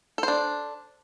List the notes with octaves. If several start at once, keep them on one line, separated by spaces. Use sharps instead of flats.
D4 A4 C5